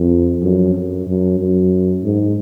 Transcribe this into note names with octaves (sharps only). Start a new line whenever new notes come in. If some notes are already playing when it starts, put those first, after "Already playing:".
Already playing: F2
F#2
F#2
F#2
F#2
G#2